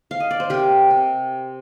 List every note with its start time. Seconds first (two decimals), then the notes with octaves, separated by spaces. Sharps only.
0.11 F5
0.20 D#5
0.31 D5
0.40 C5
0.50 C3 G4 A#4
0.91 C3